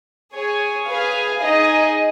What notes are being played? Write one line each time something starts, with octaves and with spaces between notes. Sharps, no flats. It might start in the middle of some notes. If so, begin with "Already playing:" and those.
G#4 C#5 G#5
G#4 B4 F5 G#5
D#4 G#4 D#5